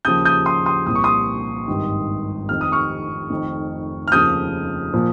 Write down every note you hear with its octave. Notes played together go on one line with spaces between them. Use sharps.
D#2 C#3 F3 D#6 G6
D#6 G6
C6 D#6
C6 D#6
C2 A#2 F3 D#6
C#6
C6 D#6
G#1 G2 D#3
F1 F2 D#3 F6
D#6
C#6 F6
F1 F2 D#3
F6
F1 D#2 C#3 F3 D#6 G6
A#2 F3